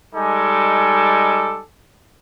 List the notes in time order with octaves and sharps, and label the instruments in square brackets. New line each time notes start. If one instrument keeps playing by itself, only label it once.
[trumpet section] G3 G#3 D#4 A4 G#5 D6